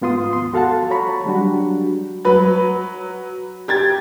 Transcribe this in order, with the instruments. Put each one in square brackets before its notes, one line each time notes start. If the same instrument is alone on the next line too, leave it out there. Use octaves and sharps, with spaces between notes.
[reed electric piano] G#2 B3 F4 C6 D#6
D#2 C6
F#4 A4 F5 F#5 A5
C#5 A#5 B5 C#6
F#3 G3 D4 F#4
[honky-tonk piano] F#3 B4
G4 G#6 A6